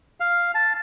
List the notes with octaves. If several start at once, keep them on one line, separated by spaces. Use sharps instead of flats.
F5
A5